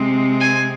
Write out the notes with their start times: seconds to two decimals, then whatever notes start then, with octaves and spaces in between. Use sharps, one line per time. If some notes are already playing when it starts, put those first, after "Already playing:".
Already playing: C3 G#3 C4
0.40 G#5